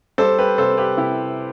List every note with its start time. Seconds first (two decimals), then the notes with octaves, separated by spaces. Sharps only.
0.18 G3 A4 C5
0.38 G4 B4
0.58 C3 A4 C5
0.78 G4 B4
0.97 C3 E4 G4